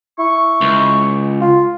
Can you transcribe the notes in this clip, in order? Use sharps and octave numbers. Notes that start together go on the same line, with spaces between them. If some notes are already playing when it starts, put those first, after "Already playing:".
E4 C#6
C#2
F4